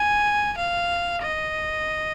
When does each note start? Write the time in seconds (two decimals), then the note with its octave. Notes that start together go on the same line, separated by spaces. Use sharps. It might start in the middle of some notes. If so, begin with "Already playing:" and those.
Already playing: G#5
0.58 F5
1.23 D#5